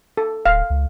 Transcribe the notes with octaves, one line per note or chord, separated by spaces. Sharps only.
A4
D1 F5
C#2